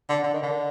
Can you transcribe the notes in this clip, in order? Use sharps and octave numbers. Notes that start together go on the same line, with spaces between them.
D3
D3
D#3
D3